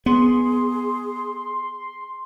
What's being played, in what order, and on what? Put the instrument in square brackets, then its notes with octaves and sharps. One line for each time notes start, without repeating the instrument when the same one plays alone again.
[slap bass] B3 [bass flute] G#4 [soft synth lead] C6